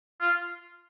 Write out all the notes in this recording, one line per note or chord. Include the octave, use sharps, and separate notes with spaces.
F4